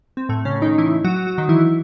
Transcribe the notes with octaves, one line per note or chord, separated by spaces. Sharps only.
C4
A2 A3
C#3 C#4
D#3 D#4
E3 E4
F#3 F#4
F#3 F#4
F#3 F#4
D#3 D#4
E3 E4